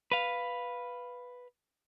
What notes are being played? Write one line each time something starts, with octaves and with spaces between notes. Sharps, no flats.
B4 F5